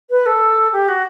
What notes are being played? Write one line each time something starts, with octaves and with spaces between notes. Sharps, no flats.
B4
A4
G4
F#4